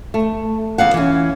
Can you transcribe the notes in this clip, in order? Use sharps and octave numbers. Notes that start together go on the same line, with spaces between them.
A3
E2 F5 F#5
E3 C#4